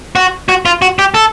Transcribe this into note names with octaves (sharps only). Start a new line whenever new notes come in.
F#4
F#4
F4
F#4
G4
A4